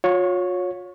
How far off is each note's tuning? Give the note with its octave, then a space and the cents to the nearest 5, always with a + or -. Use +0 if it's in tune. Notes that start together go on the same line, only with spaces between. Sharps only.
F4 +45 C#5 +0